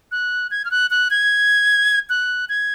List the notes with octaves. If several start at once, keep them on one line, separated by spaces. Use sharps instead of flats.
F#6
G#6
F6
F#6
F#6
G#6
F#6
G#6